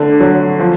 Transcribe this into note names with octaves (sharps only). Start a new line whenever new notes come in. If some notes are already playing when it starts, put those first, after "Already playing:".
Already playing: D3 A3
F#3
F3